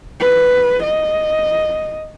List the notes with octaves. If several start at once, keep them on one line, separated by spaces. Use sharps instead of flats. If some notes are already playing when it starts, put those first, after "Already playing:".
B4
D#5